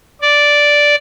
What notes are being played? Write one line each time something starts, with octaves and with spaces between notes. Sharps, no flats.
D5